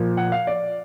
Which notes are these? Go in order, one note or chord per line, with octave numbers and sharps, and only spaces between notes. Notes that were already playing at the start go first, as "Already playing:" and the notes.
Already playing: A#2 F3
F#5
F5
D5